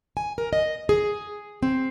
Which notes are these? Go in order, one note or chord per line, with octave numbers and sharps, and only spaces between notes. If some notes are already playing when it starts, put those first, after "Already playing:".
G#5
A#4
D#5
G#4
C4